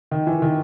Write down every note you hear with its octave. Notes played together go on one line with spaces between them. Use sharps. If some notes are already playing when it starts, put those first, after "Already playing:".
D#3
E3
D#3